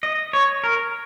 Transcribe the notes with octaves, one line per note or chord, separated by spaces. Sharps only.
D#5
C#5
A#4